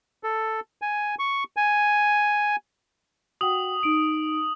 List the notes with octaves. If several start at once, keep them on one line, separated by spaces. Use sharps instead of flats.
A4
G#5
C#6
G#5
F#4 F#5 G5 D#6 F#7
D#4 D7